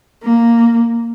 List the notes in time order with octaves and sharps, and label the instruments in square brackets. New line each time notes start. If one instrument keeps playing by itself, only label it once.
[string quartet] A#3